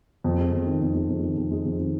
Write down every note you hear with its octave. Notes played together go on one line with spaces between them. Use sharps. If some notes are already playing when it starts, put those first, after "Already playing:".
F2
G#3
F2
D#3
F2
G#3
F2
D#3
F2
G#3
F2
D#3